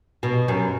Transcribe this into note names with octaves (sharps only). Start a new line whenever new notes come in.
B2
F#2